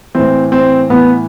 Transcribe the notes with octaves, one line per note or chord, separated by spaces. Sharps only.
A2 E3 C4
C4
A2 E3 B3